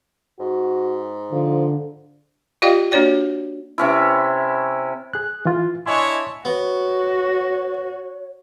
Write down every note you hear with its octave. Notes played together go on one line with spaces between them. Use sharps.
G#2 F#4
D3 F3
F4 G4 D5 D#5 F5 G5
A#3 D4 F#4 C#5 D5 G5
C3 C#4 E4
G#4 F#6
E3 F4
D4 E4 C#5 D#5 G#5 C6
B3 F#4 C#5